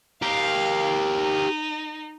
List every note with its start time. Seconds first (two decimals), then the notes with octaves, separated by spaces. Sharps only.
0.22 G4 A#4 F5
1.16 D#4